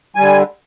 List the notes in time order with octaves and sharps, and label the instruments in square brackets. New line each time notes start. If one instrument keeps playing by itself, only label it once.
[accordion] D3 G3 G#5